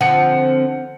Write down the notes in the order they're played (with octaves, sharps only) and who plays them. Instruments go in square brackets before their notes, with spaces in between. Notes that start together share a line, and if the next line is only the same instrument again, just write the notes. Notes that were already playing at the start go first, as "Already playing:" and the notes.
[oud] D3 F3 C4 [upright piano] F#5 C#7